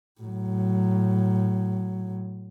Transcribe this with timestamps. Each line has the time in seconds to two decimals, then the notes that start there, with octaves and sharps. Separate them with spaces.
0.21 A2 F#3